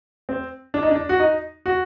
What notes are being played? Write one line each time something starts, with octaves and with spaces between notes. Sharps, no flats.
C4
D4
D#4
D4
F#4
D#4
F#4